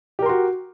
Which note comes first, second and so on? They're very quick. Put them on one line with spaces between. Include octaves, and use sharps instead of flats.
G4 A#4 C6 F#4